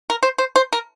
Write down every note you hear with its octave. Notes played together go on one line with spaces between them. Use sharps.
A#4
C5
C5
C5
A#4